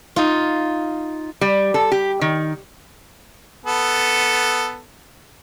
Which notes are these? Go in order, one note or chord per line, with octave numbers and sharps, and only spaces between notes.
D#4 F4
G3
A4
G4
D#3
B3 A4